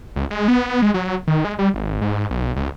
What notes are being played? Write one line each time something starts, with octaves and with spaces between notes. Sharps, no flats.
C#2
G#3
B3
G#3
F#3
D#3
G#3
G3
G#1
G#2
B1
C#2